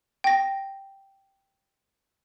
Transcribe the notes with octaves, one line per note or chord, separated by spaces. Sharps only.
G5 A#6